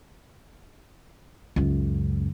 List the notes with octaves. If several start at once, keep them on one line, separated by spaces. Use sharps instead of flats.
C#2 F#2